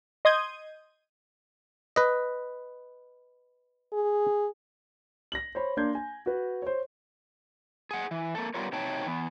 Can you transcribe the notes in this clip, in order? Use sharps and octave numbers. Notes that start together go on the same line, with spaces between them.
D#5 C6 D#6 G6 G#6 D#7
B4 D#5
G#4
A#6 F#7
C5 C#5 B5
A#3 D4 C6 G6 G#6
G#5
F#4 B4
C5 C#5
G#4 F#5
E3
A#3 A4
G3 B3 F4 G4 A#4 C#5
C3 F#3 D#4 C#5 G5 A5
E3 B3